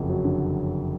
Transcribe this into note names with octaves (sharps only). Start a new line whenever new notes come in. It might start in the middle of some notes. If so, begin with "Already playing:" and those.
Already playing: F#1 F2
F#3
D3